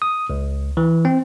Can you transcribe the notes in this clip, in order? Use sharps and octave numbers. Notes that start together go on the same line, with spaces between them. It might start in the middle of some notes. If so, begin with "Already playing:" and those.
D#6
C#2
E3
C4